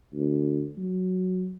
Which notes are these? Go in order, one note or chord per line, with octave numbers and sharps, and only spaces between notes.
D2
F#3